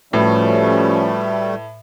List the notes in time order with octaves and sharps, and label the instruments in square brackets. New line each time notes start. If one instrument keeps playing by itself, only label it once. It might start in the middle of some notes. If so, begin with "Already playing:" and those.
[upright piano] A2 [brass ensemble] F3 C#4 [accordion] G3 A3 [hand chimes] F#4 B4 C#5